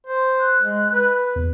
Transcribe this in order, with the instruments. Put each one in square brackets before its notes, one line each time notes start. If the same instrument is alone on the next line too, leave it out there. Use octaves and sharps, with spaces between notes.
[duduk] C5
[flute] F#6
[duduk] G#3
B4
[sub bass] E2